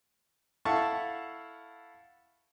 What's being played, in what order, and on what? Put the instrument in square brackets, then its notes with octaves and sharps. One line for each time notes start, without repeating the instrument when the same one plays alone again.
[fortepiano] E4 A4 F5 F#5 A5 C#6